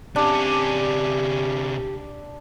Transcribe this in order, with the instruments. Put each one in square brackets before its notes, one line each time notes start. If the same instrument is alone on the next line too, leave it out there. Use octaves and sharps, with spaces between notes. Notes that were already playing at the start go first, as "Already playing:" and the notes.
[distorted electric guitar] C3 C#4 [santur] D4 [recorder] G4